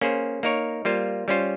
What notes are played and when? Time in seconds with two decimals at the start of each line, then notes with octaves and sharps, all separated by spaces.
0.01 A#3 C#4 G#4 C5
0.43 A#3 D#4 A#4 C#5
0.85 G3 A#3 F4 C5
1.28 G3 C#4 F4 C5